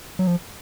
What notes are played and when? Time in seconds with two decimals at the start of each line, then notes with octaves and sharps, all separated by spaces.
0.19 F#3
0.27 F3